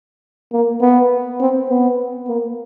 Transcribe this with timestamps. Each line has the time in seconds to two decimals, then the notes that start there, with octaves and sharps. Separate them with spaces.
0.52 A#3
0.81 B3
1.40 C4
1.69 B3
2.28 A#3